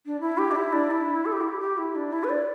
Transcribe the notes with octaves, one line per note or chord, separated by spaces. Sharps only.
D4
E4
G4
D4
E4
D4
E4
A4
G4
E4
G4
G4
E4
D4
E4
B4
D5